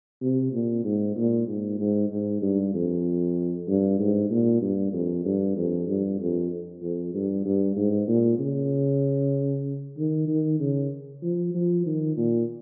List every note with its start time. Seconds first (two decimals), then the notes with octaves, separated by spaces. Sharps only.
0.22 C3
0.52 A#2
0.84 G#2
1.17 A#2
1.47 G#2
1.79 G#2
2.10 G#2
2.42 G2
2.74 F2
3.68 G2
3.99 G#2
4.30 A#2
4.62 G2
4.93 F2
5.25 G2
5.56 F2
5.87 G2
6.20 F2
6.82 F2
7.14 G2
7.45 G2
7.76 G#2
8.08 A#2
8.39 C#3
9.97 D#3
10.28 D#3
10.60 C#3
11.22 F3
11.54 F3
11.86 D#3
12.17 A#2